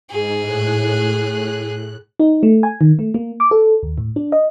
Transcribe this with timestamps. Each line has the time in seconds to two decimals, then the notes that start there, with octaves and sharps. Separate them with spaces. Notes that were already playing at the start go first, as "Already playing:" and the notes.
0.11 G#2 G#4
0.41 A2 F#6
2.20 D#4
2.43 A3
2.63 G#5
2.81 D#3
2.99 A3
3.14 A#3
3.40 D6
3.51 A4
3.83 D#2
3.98 A2
4.16 D4
4.32 D#5